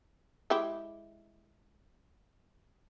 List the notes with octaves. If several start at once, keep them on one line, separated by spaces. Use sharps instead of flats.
G#3 E4 G4